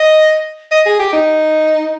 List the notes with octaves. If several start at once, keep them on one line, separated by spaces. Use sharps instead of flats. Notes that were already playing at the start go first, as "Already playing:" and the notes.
Already playing: D#5
D#5
G#4
G4
D#4